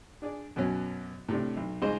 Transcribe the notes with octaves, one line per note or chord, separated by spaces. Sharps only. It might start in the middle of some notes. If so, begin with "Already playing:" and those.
D4 G#4 D5
F#2 B2 F#3 C#4
A2 C3 D4
B1
C#2 G#2 G#3 G#4 C5 D#5